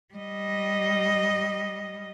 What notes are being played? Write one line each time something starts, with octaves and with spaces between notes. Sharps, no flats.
G3 D#5